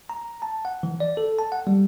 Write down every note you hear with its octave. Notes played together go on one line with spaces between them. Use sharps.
A#5
A5
F#5
E3
D5
A4
A5
F#5
G3